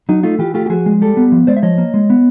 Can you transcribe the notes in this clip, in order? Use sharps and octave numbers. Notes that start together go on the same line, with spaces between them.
F#3 D#4
A3 D#4 F4
E3 F4 G4
A3 F4 G4
G4
F3 F#4 G#4
G#3
G3 G4 A4
B3
F3
G#3 C5 D5
E5
F3 C#5 D#5
A#3
G#3
B3